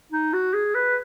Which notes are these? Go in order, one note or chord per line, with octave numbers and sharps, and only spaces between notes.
D#4
F#4
G#4
B4